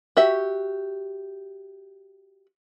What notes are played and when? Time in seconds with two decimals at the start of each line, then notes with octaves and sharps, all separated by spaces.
0.17 F#4 G4 E5